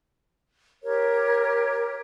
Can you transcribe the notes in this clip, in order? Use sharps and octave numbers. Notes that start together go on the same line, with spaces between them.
G4 A#4 C#5